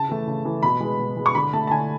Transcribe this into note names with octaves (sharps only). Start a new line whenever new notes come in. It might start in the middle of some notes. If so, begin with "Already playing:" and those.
Already playing: C#3 A5
E3 A3
C#3
E3 A3
B2 B5
G#3 B3
B2
G#3 B3
C#6
D3 B5
A3 A5
A5
D3 G#5